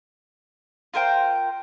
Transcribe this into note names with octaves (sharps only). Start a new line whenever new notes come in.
F4 A#4 C5 G5